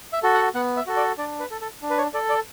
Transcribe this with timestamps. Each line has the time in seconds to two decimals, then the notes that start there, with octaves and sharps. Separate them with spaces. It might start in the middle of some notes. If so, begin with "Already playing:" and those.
0.13 E5
0.23 F#4 A4
0.34 F#5
0.55 B3 F#5
0.77 E5
0.87 F#4 A4
0.97 D5
1.18 D4 D5
1.40 B4
1.51 A4
1.61 A4
1.82 D4
1.90 B4
1.98 C#5
2.14 A4 D5
2.29 D5